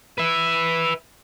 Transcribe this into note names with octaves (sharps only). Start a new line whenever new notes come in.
B4 E5